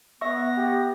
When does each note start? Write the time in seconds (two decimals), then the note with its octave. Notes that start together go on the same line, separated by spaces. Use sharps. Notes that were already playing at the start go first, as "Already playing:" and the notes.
0.21 B3 E5 C#6 A#6
0.57 G4